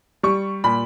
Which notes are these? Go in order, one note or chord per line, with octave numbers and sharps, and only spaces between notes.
G3 C#6
A#2 B5